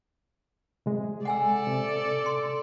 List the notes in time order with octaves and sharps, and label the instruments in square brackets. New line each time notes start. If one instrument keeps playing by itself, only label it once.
[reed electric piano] C3 G#3
[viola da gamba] A4 D5 [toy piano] F#5 G#5 E6
[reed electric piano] C3
[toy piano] C6